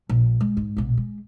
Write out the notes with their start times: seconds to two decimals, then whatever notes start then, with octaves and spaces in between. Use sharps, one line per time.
0.09 A#1
0.41 G#3
0.57 G#2
0.77 A#1 B2
0.97 G#3